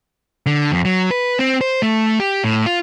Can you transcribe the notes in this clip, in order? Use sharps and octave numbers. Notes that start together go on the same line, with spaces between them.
D3
F2
F#3
B4
C4
C5
A3
G4
A2
F4